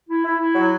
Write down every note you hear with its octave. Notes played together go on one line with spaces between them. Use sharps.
E4
E4
E4
F#3